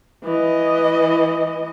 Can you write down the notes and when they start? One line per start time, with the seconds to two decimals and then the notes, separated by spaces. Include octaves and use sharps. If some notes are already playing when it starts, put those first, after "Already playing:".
0.24 E3 D#5